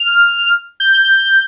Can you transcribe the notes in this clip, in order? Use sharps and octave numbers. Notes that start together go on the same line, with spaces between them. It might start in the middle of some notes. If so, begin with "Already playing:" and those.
Already playing: F6
G6